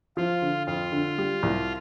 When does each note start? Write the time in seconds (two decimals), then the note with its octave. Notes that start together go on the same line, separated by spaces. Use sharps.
0.17 F3 F4
0.42 D3
0.67 F2 F4
0.92 D3
1.18 G3
1.43 C2